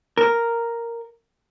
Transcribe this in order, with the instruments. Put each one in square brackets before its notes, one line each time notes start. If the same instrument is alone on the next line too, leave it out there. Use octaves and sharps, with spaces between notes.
[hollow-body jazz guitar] A#4